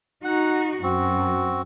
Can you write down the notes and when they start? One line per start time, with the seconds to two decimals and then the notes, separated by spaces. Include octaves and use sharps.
0.24 D#4 F#4 F#5
0.83 F#2 C4 F#4